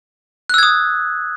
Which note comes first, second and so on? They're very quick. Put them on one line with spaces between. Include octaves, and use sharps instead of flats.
F#6 E6 G#6 D#6